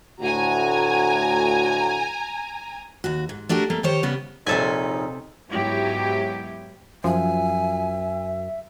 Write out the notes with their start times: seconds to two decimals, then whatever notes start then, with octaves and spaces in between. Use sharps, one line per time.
0.21 D2 A2 F#4 G#5 A#5
3.04 D#2 F#4
3.29 G#2
3.49 A3 D4 F#4 G4 A#4
3.70 G3 A3 A#3
3.83 D#3 G4 C5 C#5
4.03 C#3 G3 B3
4.47 A#1 D#2 C3 D#4 A4 E5 G#5
5.49 G#2 F#3 B3 E4 G4
7.04 F#2 F3 E5 G#5